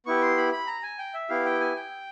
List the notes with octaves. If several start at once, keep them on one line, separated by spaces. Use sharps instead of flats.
B3 E4 G4 C#6
C6
B5
B5
A#5
G#5
G5
E5
B3 E4 G4 F5
G5
G#5
G5